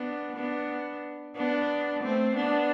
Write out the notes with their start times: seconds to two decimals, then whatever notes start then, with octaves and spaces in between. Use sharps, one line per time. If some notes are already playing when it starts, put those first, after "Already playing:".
Already playing: B3 D4
0.36 B3 D4
1.36 B3 D4
2.03 A3 C4
2.36 B3 D4